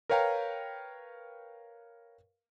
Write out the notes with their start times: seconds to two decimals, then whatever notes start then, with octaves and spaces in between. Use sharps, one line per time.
0.10 A#4 B4 C#5 F5 G5 A#5